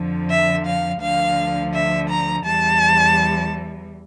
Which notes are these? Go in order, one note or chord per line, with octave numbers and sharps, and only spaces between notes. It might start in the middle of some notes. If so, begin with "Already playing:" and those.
Already playing: F2 D3 F3
E5
F5
D2 D3 F3 F5
E5
A#5
E2 E3 G3 A5